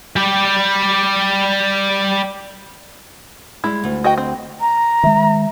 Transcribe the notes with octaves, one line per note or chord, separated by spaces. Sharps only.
G3 G4
G3 G#3 E4
D2
F#4 D#5 G5
C4
A#5
D#3 G#3 E5